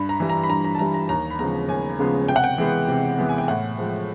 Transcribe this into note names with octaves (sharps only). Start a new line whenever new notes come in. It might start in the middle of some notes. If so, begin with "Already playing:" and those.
Already playing: G2 B5
A#5
E3 G3
A#5
B5
G2 A#5
A#5
A5
E3 G3 A#5
A#5
D#2 A#5
B5
C#3 F3 G#3 B3 A#5
D#2 G#5
C#3 F3 G#3 B3
C3 G5
F#5
G5
E3 G#3 B3
C3
E3 G#3 B3
G#5
G5
A2 F#5
F3 G#3